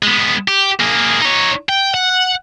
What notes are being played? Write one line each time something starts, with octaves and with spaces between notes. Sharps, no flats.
G#3 B3
G4
A#3 G#4
D#4 C#5
G5
F#5